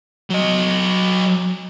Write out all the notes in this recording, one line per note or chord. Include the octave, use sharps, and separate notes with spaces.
F#3 D#5